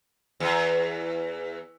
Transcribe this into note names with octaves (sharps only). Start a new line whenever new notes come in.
E2